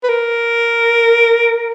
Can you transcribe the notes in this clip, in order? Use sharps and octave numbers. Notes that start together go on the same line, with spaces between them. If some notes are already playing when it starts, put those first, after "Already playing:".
B4
A#4